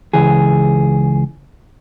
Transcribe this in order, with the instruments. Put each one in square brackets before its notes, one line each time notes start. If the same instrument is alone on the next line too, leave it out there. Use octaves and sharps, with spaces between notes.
[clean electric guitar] C#2 E3 G#4